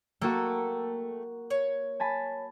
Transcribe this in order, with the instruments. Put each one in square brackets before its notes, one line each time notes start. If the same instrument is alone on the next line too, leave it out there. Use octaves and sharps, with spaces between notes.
[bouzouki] A3 A4 G5 [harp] A#3 F#4
[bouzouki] C#5
[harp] G#5 A5 B5